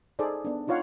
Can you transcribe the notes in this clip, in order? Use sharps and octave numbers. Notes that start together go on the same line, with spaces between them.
D#4 G#4 A4 C5 D5
B3 D4
D4 D#4 F4 C#5 F5 F#5